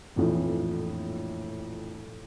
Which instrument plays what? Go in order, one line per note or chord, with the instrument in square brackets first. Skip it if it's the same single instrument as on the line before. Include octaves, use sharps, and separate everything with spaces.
[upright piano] A#1 F2 A2 E3